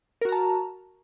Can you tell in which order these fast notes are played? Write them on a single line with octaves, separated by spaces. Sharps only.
A#4 F#4 A#5 A5